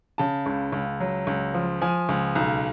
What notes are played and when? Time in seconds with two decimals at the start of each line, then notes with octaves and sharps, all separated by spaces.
0.18 C#3 A5
0.46 C#2
0.72 C#2
1.00 F#3
1.27 C#2
1.54 F3
1.81 F3 G#5
2.09 C#2
2.35 B1